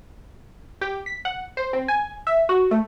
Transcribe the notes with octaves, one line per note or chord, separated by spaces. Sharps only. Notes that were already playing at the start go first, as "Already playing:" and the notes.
G4
B6
F#5
C5
C4
G#5
E5
F#4
A3